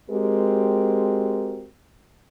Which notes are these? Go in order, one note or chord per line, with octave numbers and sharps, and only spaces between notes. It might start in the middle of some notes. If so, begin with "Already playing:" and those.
G#3 C4 F#4 G4 A#4